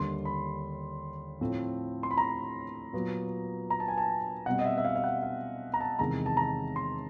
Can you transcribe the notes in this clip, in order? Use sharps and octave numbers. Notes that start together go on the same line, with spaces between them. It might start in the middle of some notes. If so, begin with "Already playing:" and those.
Already playing: D#2 D3 G3 C6
B5
A2 F3 A3 C4
C6
B5
A#5
A#2 F#3 B3
A#5
A5
G#5
A5
B2 G3 C4 F#5
D#5
E5
E5
F5
F5
F#5
F5
A#5
A5
E2 C3 D#3 G#3 A#5
A5
A#5
C6